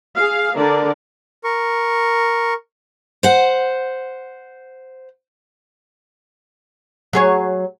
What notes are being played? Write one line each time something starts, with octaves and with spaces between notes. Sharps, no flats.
G#4 F5
D3 A#4 D5
A#4 C#6
C5 F#5
F#3 G#4 C#5